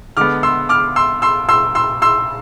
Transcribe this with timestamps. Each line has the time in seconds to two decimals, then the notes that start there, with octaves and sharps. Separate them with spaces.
0.17 D3 G#3 B3 D6 F6
0.43 C6 E6
0.69 D6 F6
0.96 C6 E6
1.22 C6 E6
1.49 C6 E6
1.75 C6 E6
2.02 C6 E6